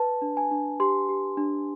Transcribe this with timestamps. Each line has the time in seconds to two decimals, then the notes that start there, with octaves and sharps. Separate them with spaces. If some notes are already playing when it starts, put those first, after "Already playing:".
Already playing: B4 A5
0.22 D4
0.37 G#5
0.51 D4
0.80 G4 C6
1.09 G4
1.37 D4